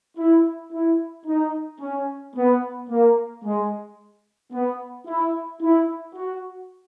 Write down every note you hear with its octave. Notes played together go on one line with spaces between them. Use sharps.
E4
E4
D#4
C#4
B3
A#3
G#3
B3
E4
E4
F#4